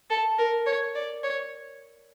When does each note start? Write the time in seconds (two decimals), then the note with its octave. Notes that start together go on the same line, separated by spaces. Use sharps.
0.10 A4
0.38 A#4
0.66 C#5
0.95 D5
1.23 C#5